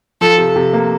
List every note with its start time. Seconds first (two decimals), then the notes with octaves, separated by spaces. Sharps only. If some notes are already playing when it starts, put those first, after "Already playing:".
0.21 F3 A4
0.38 C3
0.56 C3
0.73 A#3